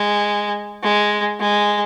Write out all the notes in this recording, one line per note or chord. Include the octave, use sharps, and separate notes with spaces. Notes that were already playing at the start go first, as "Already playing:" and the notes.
Already playing: G#3
G#3
G#3